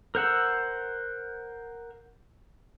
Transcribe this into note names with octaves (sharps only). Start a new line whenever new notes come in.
A#4 C5 F#5 E6